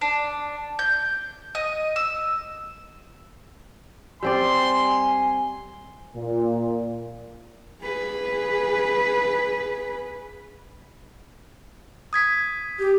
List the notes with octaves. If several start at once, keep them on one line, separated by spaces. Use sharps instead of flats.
D4
G6
D#5
E6
G3 C4 D5 G#5 C6
A#2
G#4 B4
D#6 G#6 B6
G4